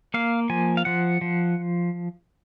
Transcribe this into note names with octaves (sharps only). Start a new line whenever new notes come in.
A#3 F5
F3 G#5
F5
F3 F#5
F3